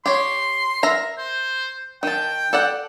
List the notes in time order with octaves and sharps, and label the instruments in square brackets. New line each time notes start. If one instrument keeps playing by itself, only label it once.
[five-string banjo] G4 C#5 [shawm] C6
[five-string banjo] A#4 E5 A#5
[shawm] C5
[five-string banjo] D#3 A5 [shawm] G5
[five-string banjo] A4 D5 F#5